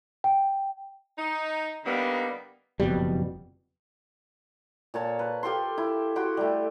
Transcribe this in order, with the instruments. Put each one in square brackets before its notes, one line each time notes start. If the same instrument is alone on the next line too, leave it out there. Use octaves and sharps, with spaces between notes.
[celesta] G5
[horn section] D#4
D3 G3 A#3 B3 D#4
[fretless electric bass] F#1 F2 B2 G3
[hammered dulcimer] A#2 C#5 A5
B4
F4 G4 A4 C6
E4
F#4 G4 G5 C6
G3 A3